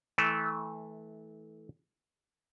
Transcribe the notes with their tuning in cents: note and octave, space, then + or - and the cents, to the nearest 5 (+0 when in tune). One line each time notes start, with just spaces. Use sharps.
E3 -30 A3 -15